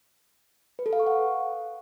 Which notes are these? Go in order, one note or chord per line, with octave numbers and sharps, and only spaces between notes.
B4
A4
F5
C#6
F#5